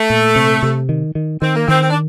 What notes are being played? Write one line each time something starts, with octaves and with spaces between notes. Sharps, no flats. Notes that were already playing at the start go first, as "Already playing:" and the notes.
Already playing: A3
A#2
C3
C3
D#3
D#3
D#3 C4
A#3
D#3 C4
C4
D4